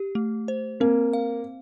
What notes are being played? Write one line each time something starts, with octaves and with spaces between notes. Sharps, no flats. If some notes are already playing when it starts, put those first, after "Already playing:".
Already playing: G4
A3
C5
A#3 C4
F5